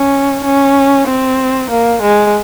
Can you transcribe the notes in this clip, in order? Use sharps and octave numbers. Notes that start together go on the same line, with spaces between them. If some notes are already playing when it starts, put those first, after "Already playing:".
Already playing: C#4
C#4
C4
A#3
G#3